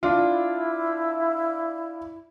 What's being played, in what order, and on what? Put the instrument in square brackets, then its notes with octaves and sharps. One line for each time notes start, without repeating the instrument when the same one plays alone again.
[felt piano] D4 F4 [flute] E4